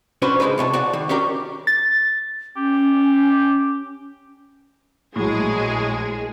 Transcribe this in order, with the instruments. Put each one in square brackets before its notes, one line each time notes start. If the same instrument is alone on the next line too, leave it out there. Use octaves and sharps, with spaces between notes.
[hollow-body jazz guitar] C#4 D4 F#4 B4 C5
C#2 B2 G#3 D#4 B4
C3 C#5 G#5 A5
F#4 D5 F#5
D#3
C#4 D4 F#4 G4 A#4 D5
[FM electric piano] A6
[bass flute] C#4 [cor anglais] G4
[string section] A#1 G#3 G#4 [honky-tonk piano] A2 F#3